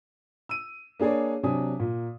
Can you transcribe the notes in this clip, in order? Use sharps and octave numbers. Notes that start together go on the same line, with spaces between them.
E6 D#7
A#3 D4 G#4 C#5 D5
C3 F#3 D4 G#5 D#6
A#2